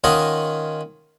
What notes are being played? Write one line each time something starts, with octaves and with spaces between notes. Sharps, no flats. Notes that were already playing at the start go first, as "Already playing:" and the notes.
D#3 C#4 F4 C#5 D#5 F#5